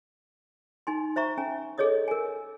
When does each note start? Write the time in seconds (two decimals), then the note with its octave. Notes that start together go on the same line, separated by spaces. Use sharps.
0.87 D#4 G#5 C6
1.16 C5 E5 A#5 C#6
1.37 C#4 G#5 A#5
1.78 G#4 A4 C#5 D#5 D#6
2.08 A#4 G#5